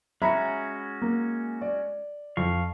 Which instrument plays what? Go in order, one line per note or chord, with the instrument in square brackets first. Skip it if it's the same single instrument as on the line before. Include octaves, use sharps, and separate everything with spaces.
[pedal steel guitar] G#3 C#4 F#4 [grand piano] E5 A#5 B5
[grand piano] A#3
D5
[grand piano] F2 [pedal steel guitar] F5 C#6